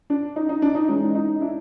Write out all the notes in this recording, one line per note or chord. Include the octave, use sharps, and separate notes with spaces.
D4
D#4
D#4
D4
D#4
E3 G#3 C#4 D#4
D#4
D4 E4